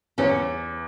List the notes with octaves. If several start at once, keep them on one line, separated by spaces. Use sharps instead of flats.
E2 C#4